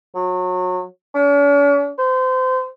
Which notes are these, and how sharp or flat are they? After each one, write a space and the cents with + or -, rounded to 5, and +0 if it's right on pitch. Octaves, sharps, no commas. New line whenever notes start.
F#3 -30
C#4 +45
C5 -30